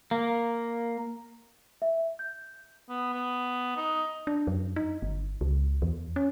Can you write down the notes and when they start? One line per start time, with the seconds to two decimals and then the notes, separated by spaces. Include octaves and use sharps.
0.11 A#3
1.82 E5
2.19 G6
2.89 B3
3.13 B3
3.77 D#4
4.27 D4
4.47 F#2
4.76 D#4
5.02 G1
5.41 C#2
5.82 E2
6.16 C#4